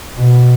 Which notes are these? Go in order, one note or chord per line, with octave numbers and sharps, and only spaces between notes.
B2